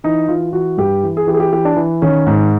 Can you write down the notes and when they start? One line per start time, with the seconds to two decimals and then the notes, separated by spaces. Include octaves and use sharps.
0.04 E3 D#4
0.28 E3 F4
0.53 E3 F#4
0.77 G2 G4
1.03 E3
1.17 G#4
1.27 E3 G4
1.34 G#4
1.40 G4
1.52 E3 G4
1.65 D4
1.76 E3
2.02 D#3 C#4
2.26 G#2